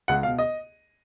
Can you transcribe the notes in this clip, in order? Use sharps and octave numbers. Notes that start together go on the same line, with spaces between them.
C#2 F#5
B2 F5
D#5